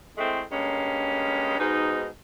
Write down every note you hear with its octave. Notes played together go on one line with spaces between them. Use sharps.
A2 G#3 A3 C4
G2 G#3 A#3 C#4
G#2 B2 D#4